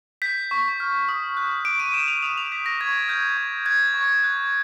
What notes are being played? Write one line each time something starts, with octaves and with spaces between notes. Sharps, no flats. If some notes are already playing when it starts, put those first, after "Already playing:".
G6 B6
C#6
F6
D#6
F#6
D6 D7
D#7
G6 E7
F7
D#6 F7
F7
G6 B6
A#6
C#6 G#6
F6 G6
C#6
F#6 G#6
C#6
F#6